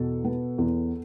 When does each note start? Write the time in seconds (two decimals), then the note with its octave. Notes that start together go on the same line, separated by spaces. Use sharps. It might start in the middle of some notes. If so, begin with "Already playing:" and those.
Already playing: E2 B2 A4
0.24 B3
0.58 E2